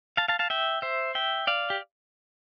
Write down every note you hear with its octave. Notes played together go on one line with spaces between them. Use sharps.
F5 A5
F5 A5
F5 A5
E5 G5
C5 E5
E5 G5
D5 F5
G4